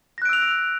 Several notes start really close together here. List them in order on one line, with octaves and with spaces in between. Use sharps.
A#6 F#6 D7 E6 F7